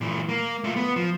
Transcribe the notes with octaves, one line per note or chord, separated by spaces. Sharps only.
A#2 E3
A#3
A3 F4
B3
F3